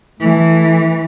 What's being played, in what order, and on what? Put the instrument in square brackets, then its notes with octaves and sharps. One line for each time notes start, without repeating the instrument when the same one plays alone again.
[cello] E3 [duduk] A3